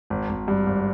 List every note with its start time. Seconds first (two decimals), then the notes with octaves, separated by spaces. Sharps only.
0.10 G#1
0.29 G#1
0.48 G2
0.67 G#1